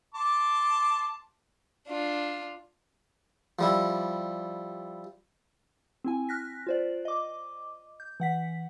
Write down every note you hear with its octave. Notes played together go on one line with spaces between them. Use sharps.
A5 C6 D6
D4 F4
F3 G3 E4
C4 E4 G#5
F6 F#6 A#6 B6
F4 C5 D5
D#5 D6
G6
E3 F#5 B6